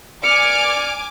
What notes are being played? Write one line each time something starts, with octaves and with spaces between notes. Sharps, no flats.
D5 G#5 D6 F6 C#7